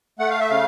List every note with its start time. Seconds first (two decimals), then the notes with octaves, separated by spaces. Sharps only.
0.19 A3 F#5
0.30 F5
0.40 E5
0.50 C#3 F5